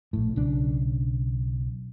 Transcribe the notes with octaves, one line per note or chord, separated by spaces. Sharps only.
A#1 A2
B1 C#3 D4